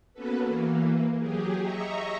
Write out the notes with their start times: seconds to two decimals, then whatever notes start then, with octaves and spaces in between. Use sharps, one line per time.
0.13 A#3 B3 C#4 F#4 A4 B4
0.46 E3 A#3
1.17 F#3 G4 G#4
1.62 D#5 E5 A#5 C#6